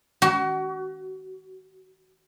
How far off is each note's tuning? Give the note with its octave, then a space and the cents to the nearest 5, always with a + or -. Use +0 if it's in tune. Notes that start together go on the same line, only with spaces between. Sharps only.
F#4 +30